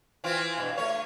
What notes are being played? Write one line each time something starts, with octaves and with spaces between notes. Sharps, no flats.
E3 C4 F4
G2 B2
A3 C#5